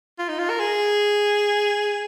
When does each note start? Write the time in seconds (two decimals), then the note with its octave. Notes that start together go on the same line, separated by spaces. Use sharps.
0.19 F4
0.29 D#4
0.39 F4
0.50 A#4
0.60 G#4